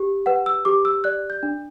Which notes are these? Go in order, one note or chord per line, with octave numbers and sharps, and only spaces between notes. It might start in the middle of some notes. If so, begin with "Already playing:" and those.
Already playing: G4
B4 F#5
E6
G4 D6
E6
D5 F#6
G6
D4